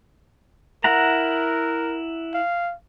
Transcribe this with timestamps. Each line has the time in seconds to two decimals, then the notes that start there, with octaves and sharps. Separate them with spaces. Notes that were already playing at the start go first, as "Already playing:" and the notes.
0.84 E4 A#4 F#5 A#5
2.34 F5